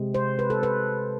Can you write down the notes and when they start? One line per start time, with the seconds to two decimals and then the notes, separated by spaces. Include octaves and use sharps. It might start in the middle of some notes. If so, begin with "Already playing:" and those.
Already playing: C3 G#3
0.14 C5
0.39 B4
0.50 A4
0.63 B4